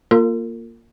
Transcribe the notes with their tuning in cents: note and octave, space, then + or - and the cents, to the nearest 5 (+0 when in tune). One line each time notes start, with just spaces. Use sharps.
A#3 +0 F4 +0 A#4 -40